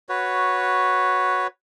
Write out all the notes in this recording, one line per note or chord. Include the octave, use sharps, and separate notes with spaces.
F#4 B4 C#5